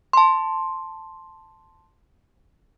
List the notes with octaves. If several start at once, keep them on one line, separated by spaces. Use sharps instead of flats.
A5 C6